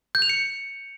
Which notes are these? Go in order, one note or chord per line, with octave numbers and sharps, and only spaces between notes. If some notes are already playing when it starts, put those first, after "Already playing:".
G6
F7
C#7